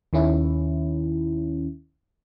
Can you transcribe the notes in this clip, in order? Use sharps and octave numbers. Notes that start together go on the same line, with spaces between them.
D#2 D#3 C#4 E4